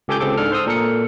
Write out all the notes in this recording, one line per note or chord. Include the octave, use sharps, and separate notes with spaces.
C#2 G4 A4 G#5 D6 G6
C#2 C4 G#4 A4 D6
G#2 D4 A4 F6
C5 C6 D#6 E6
A#2 A4 A#4 C#7